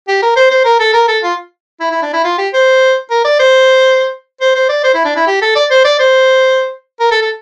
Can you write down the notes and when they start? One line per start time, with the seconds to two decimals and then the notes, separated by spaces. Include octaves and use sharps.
0.08 G4
0.22 A#4
0.36 C5
0.51 C5
0.65 A#4
0.80 A4
0.94 A#4
1.08 A4
1.23 F4
1.81 E4
1.91 E4
2.02 D4
2.13 E4
2.24 F4
2.38 G4
2.54 C5
3.11 A#4
3.25 D5
3.40 C5
4.41 C5
4.56 C5
4.69 D5
4.84 C5
4.95 E4
5.05 D4
5.17 E4
5.27 G4
5.42 A4
5.56 D5
5.71 C5
5.85 D5
6.00 C5
7.00 A#4
7.11 A4
7.22 A4